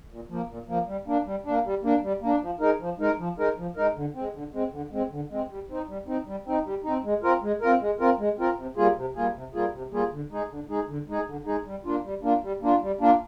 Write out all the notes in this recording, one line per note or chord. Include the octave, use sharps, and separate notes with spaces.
A#2
F3 A#3
A#2
F3 A#3
G3
A#3 D4
G3
A#3 D4
G3
A#3 D4
G3
A#3 D4
F3
G#3 D#4 A#4
F3
G#3 D#4 A#4
F3
G#3 D#4 A#4
F3
G#3 D#4 A#4
D3
G#3 C4
D3
G#3 C4
D3
G#3 C4
D3
G#3 C4
G3
C4 D#4
G3
C4 D#4
G3
C4 D#4
G3
C4 D#4
G#3
C4 F4 A#4
G#3
C4 F4 A#4
G#3
C4 F4 A#4
G#3
C4 F4 A#4
C3
G3 A#3 F4 G#4
C3
G3 A#3 F4 G#4
C3
G3 A#3 F4 G#4
C3
G3 A#3 F4 G#4
D3
G#3 D#4 G#4
D3
G#3 D#4 G#4
D3
G#3 D#4 G#4
D3
G#3 D#4 G#4
G3
A#3 D4 F4
G3
A#3 D4 F4
G3
A#3 D4 F4
G3
A#3 D4 F4